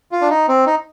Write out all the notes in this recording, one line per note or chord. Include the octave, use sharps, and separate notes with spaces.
F4
D4
D#4
C4
D#4